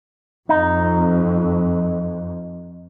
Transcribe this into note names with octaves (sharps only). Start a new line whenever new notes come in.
F2 D#4